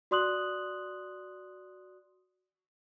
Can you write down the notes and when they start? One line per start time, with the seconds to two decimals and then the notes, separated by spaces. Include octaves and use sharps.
0.11 F#4 D5 C6 D#6 F#6 F#7